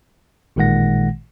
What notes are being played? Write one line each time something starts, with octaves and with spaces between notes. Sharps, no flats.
A1 A#2 D#3 G#3 F#5 A#6